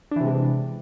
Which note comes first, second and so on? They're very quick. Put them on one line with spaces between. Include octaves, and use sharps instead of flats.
D4 E3 C3 G#3